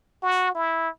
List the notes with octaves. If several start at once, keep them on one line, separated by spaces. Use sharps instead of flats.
F#4
E4